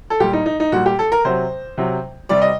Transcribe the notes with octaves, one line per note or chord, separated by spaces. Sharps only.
A4
A#2 G3 G4
D#4
D#4
D#4
A#2 G3 F#4
G4
A4
A#4
C3 F#3 C5
C3 F#3
C3 G3 D5
D#5